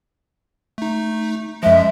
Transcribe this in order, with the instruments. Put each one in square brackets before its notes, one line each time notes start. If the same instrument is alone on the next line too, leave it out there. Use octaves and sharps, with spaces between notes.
[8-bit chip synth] A3 D#4
[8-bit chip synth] F#2 F3 [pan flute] G#3 [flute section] E5